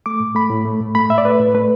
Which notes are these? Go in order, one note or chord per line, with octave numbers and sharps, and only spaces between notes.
A3 D6
A2
A3 B5
A2
A3
A2
A3 B5
A2 E5
D5
A3 B4
A2
A3 B4